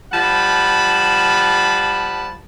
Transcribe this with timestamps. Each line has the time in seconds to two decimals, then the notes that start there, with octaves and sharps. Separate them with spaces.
0.12 F3 G3 F#5 A5 B5